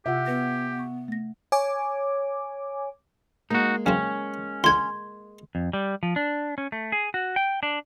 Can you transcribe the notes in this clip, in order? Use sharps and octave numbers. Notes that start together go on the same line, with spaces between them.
C3 F4 G4 E5 F#5
B3 B4 A#6
C#6
A3 A#6
C#5 G#5 D6
G#3 A#3 D#4 F#4
F#2 C#3 C4 C#4
C#2 D3 F#5 C6 G#6
F2
G3
F3
D4
C#4
A3
G#4
F#4
G5
D4